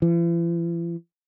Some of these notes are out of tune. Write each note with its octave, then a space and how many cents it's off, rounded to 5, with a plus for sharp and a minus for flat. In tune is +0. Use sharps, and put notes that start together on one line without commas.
E3 +45